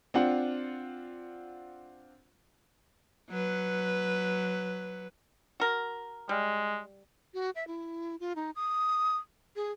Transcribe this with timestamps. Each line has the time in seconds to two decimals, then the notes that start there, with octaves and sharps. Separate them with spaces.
0.14 C4 D4 F4 F#5
3.30 F#3 B4
5.60 F#4 A#4
6.29 G3 G#3
7.34 F#4
7.56 E5
7.67 E4
8.20 F4
8.36 D#4
8.56 D#6
9.56 G#4